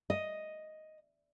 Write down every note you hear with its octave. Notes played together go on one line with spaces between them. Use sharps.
D#5